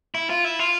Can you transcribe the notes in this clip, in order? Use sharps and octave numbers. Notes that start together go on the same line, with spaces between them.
E4
F4
E4
F4